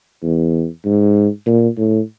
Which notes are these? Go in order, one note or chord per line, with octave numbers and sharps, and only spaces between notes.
E2
G#2
A#2
A2